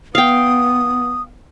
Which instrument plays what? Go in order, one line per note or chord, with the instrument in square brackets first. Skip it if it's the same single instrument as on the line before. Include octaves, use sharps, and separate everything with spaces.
[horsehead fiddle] B3 [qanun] F5 G5 [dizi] D#6